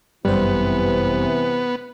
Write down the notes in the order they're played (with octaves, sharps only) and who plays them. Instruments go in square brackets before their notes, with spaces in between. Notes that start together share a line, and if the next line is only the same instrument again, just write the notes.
[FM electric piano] G1 F#2 C5 [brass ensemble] C3 E3 [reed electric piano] G3 [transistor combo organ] B3